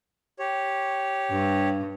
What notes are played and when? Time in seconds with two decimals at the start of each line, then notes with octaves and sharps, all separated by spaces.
0.39 G4 C#5
1.31 G2